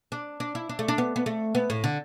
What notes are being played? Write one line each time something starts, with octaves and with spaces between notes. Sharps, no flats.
D4
D4
E4
D4
A3
D4
B3
B3
A3
B3
A2
D3